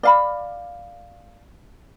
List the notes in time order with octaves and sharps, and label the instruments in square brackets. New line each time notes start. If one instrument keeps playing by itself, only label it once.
[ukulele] D5 F5 B5